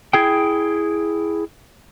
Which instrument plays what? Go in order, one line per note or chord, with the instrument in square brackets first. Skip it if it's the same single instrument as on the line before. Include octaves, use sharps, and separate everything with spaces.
[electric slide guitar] E4 G#4 G5